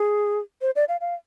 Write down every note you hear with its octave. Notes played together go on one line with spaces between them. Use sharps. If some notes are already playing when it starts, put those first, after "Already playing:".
Already playing: G#4
C5
D5
F5
F5